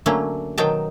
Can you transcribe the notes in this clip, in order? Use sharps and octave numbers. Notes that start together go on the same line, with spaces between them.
D3 F#3 A3 A#3 C#4
B2 D#3 F#3 D#4 G5 A5